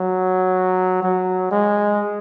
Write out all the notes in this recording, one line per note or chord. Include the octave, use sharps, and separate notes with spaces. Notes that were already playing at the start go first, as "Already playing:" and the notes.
Already playing: F#3
F#3
G#3